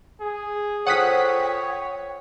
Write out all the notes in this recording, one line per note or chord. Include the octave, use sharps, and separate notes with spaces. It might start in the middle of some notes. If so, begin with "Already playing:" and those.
G#4
F4 A4 C5 C#5 F#5 G5 D#6 B6